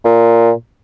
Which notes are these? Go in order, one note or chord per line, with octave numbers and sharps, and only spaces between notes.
A#2